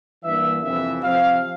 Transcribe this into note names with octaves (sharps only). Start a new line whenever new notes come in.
G2 E3 A#3 E5
F2 C3 E3 E5
C3 F3 C4 F5